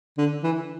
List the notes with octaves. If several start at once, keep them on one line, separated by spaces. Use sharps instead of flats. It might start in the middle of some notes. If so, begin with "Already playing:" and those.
D3
E3